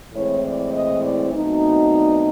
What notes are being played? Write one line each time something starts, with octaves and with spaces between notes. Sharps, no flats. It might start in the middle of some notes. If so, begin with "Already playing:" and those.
A2 E3 G#3 C4 C#5
D5
D#5
D5
B2 F#3 A3 C4 D#4
D#5
D5